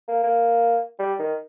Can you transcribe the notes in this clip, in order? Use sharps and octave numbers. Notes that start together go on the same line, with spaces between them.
A#3
A#3
G3
D#3